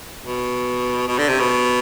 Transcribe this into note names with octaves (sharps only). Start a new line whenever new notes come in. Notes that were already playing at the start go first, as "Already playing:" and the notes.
B2
B2
D3
C3
B2